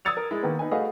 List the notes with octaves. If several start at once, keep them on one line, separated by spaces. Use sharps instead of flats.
D#6 E6 G#6 A6 C#7 F7
A#4
G#3 E4
D#3 A#3 B3
B3 D#4 B4 G#5
A3 F#4 G#4 B4 D#5 F5